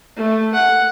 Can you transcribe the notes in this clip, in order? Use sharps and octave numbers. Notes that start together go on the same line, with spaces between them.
A3
F#5